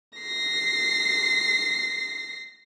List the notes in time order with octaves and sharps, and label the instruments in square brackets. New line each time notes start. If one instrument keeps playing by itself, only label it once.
[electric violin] A#6 C7